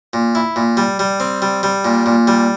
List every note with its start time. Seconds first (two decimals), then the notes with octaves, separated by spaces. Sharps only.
0.13 A#2
0.35 E4
0.56 A#2
0.77 G3
0.99 G3
1.20 C4
1.42 G3
1.63 G3
1.85 A#2
2.06 A#2
2.27 G3